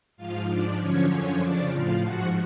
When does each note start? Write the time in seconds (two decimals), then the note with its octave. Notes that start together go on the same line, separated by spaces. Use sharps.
0.17 G#2 F3 F4 F5
0.48 G#2 F3 D4 D5
0.79 F#2 D3 F3 C#4 C#5
1.10 F#2 D3 F3 C#4 C#5
1.41 F2 C#3 F3 D4 D5
1.71 A2 F3 F4 F5
2.03 G#2 F3 F#4 F#5